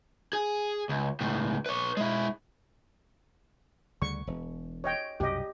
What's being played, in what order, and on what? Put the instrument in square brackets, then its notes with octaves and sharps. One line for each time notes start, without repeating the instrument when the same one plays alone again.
[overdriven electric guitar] G#4
C#2
C#2 A2
B4 C#5
G#3 E4
[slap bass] D2 C#3 G3 [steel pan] C#6
[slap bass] E1
[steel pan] C#5 D#5 G5
[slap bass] C2 F#2 B2 [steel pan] G4 D#5